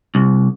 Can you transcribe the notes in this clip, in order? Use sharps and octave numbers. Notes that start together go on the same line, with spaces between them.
C2